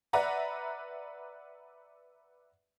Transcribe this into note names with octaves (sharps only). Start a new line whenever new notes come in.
B4 D5 E5 F#5 A#5